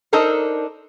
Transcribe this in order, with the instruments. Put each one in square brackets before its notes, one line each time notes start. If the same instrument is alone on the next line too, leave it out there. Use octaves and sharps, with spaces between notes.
[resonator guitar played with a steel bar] D4 D#4 A4 A#4 C5